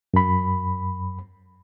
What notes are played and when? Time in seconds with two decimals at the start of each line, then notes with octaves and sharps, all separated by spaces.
0.14 F#2 B5